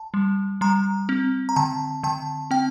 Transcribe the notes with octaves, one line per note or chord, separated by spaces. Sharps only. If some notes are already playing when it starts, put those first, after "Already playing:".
Already playing: A5
G3
G3 A#5
C4
A#5
D3 A5
D3 A5
C4 G5